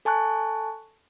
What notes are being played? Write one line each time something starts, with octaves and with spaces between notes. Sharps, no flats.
A4 G#5 A5 C#6 F#6